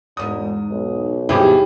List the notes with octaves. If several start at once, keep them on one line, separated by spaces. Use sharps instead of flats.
E1 E2 G#2 D#6
B1
G#1 D#2 B2 F#3 G3 E4 G4 G#4